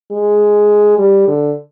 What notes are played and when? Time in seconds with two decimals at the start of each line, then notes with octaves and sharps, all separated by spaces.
0.11 G#3
0.98 G3
1.28 D3